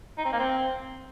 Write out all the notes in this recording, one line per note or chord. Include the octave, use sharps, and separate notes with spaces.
D#4
C4
A#3
C4